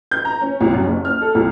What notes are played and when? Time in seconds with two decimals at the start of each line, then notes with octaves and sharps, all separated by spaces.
0.11 G6
0.25 A#5
0.41 C#4
0.61 C2
0.74 F#2
0.86 F#1
1.05 F6
1.22 A4
1.35 C2